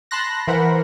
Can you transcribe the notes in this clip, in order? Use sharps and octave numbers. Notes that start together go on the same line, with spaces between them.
A5 B5 C6 F#6 A#6
E3 A#4 C5 F#5 B5